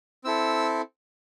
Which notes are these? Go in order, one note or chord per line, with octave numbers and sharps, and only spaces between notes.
C4 E4 A4 E6